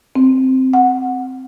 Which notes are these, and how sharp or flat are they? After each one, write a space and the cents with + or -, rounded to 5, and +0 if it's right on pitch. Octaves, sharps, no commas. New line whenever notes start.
C4 -5
F#5 -5